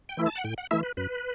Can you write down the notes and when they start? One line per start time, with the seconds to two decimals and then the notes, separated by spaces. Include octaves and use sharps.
0.09 G5
0.17 E3 A3 E4
0.26 A5
0.36 F#5
0.44 A2 G5
0.58 F#5
0.71 E3 A3 E4 E5
0.83 B4
0.97 F#2 B4